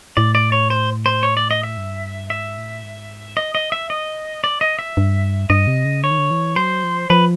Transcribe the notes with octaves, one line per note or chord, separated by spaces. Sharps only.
A2 D5
D5
C#5
C5
C5
C#5
D5
D#5
E5
G2
G#2 E5
A2
G#2
D#5
D#5
E5
D#5
D5
D#5
E5
G2
G2 D#5
C3
C#3
D3 C#5
D#3
D3
E3
F#3 C5
F3
F3 B4